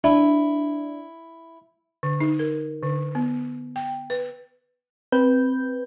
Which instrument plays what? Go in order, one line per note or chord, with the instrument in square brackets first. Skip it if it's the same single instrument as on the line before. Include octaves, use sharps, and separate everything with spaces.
[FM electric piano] D4 [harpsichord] E4
[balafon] D3
D#4
A#4
D3
B3
G5
B4
[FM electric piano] C4 B4 G6